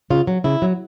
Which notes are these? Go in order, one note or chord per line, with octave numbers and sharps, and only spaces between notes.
C#3 F4
F#3
C#3 E4
F#3